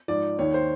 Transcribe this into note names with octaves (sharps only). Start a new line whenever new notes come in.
G#2 F3 D5
D#2 D#3 C#5
C5